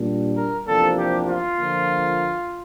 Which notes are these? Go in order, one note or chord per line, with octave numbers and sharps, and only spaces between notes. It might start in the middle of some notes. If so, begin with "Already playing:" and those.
Already playing: A#2 G3 D4
A#4
E2 C3 F3 A#3 D4 A4
G4
F4
D3 F3 A#3